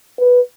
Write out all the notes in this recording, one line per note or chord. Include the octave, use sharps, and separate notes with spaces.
B4